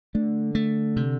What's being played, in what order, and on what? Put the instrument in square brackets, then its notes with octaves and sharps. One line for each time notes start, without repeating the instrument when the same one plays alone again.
[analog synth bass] D3 [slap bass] A3
[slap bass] A3
C3